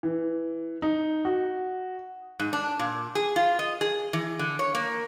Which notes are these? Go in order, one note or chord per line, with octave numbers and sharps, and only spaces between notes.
E3
D#4
F#4
G#2
D4
A#2
G#4
F4
D#5
G#4
E3
D3
C#5
A#3